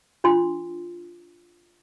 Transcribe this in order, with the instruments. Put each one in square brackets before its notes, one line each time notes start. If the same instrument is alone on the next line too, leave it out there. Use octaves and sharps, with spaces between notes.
[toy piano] D4 F4 C6